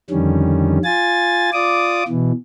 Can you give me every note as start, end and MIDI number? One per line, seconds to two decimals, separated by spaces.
0.10 0.78 41
0.10 0.78 50
0.10 0.78 51
0.10 0.78 55
0.10 0.78 61
0.84 1.50 65
0.84 1.50 80
0.84 1.50 93
1.53 2.03 65
1.53 2.03 74
1.53 2.03 86
1.53 2.03 87
2.08 2.32 47
2.08 2.32 52